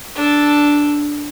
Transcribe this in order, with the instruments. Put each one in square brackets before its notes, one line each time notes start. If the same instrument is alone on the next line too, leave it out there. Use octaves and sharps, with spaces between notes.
[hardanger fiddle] D4 A4